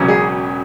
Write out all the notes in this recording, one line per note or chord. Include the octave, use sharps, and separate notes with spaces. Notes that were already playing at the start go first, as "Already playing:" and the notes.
Already playing: E1 E2 C#3 F#3 C#4
G#4